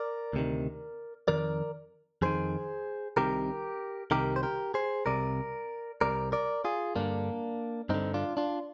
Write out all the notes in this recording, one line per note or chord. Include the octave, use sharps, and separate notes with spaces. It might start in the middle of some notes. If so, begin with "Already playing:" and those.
Already playing: A#4 D5
D2 C3 D#3
F2 D#3 A#4 D5
F2 D#3 G#4 C5
C2 C3 D#3 G4 A#4
C2 C3 D#3 G4 A#4
C5
G4 A#4
G#4 C5
C2 C3 A#4 D5
C2 C3 A#4 D5
A#4 D5
F4 G#4
G2 D3 A#3 D4
G2 D3 C4 D#4
D4 F4
D4 F4